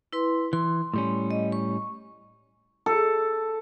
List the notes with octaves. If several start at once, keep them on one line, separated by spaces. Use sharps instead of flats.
E4 B4 C6
E3 C6
A2 G3 C#4
D#5
C#6
A4